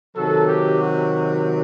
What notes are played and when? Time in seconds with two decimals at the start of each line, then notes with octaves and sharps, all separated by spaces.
0.14 C3 D#3 F#3 A4
0.46 G4
0.78 F#4